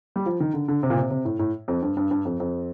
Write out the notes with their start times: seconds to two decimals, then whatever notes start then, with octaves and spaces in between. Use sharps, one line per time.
0.16 G3
0.26 F3
0.40 D#3
0.54 D3
0.68 D3
0.83 C3
0.90 A#2
0.97 C3
1.11 C3
1.25 A2
1.39 A2
1.68 F2
1.82 G2
1.97 G2
2.11 G2
2.25 F2
2.40 F2